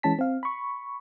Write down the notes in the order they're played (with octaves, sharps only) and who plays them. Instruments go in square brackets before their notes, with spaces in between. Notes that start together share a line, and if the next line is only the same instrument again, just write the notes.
[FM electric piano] E3 G#3 C#4 A5 B6
C4 F5
B5 C#6